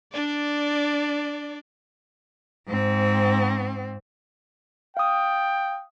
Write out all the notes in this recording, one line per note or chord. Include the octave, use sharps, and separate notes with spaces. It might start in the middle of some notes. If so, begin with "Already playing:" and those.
D4 D5
G#2 C4
F5 G5 D#6